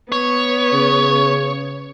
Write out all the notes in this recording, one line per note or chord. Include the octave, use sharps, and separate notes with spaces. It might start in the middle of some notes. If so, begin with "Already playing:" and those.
B3 C#5
C#3